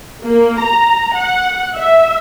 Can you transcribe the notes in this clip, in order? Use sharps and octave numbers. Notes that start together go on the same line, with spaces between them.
A#3
A#5
F#5
E5